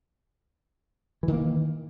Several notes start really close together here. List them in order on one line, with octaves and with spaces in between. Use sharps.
E3 D#3 A#3